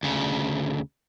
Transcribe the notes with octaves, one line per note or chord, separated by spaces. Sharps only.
D2 C#3